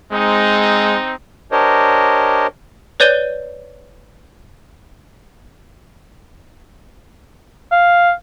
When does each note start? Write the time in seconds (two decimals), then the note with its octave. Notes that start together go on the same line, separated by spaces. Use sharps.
0.12 G#3 C4 D#4
1.52 D4 G4 A#4 C5 C#5 D#5
3.00 B4 C#5 D5 G6 D#7 G7
7.72 F5